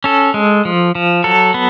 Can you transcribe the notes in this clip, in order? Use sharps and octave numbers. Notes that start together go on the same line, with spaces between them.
C#4 A4
G#3
F3
F3
F#3 A4
B3